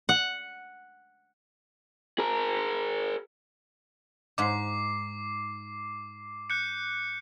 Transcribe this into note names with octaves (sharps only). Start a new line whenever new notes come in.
F#5
G#4 A#4
G#2 D#4 D6 C7
F#6 G6 C#7